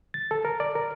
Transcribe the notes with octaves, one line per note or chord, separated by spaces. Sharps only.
A6
A4
A#4
D5
A#4